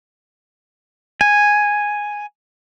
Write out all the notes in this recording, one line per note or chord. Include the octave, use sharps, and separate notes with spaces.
G#5